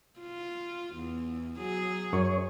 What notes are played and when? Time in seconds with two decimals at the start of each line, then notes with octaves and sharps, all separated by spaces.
0.20 F4
0.95 E2
1.58 F#3 G#4
2.13 F#2 C#5